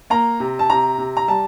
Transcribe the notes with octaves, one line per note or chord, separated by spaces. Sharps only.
A#3 A#5
C3
A5
C3 A#5
C3
A#5
G3 A5